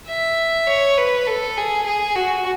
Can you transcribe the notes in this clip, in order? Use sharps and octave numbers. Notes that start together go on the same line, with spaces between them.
E5
C#5
B4
A4
G#4
G#4
F#4